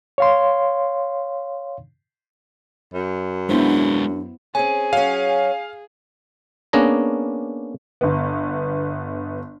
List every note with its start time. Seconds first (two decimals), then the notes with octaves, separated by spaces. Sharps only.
0.18 C#5 F5 C6
2.94 F#2
3.49 G#3 B3 D4 E4 B4 C5
4.55 C4 C#4 G#4 G#5
4.93 F#3 C#4 F5
6.73 A#3 B3 C#4 D4 G#4 A#5
8.01 G1 B3